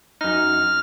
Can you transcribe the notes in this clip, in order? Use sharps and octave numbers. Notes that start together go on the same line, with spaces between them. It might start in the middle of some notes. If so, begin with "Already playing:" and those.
F#2 D#4 F6